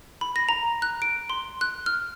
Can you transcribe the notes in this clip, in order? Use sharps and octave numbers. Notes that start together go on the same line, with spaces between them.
B5
A#6
A#5
F#6
D7
C6
F#6
F6